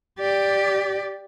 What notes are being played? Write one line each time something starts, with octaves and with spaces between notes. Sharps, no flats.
G4 D5